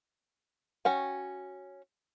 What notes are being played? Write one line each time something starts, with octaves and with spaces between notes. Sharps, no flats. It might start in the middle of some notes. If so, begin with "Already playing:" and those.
C#4 F#4 G5